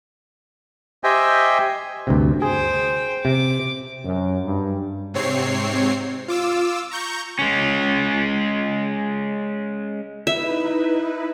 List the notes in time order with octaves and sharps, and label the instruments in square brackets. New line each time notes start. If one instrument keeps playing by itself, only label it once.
[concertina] G4 C5 D#5 E5 G5 G#5
[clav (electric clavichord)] D2 G2 C3
[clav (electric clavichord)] G#4 [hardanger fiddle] C5 G5
[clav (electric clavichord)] C3 [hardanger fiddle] D6
[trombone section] F#2
G2
[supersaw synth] G#2 C3 C4 C#5 C7
F4 D6 E6
A#5 C#6 G6
[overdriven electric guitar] G#3 C#4
[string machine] D#4 E4 B4 [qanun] E5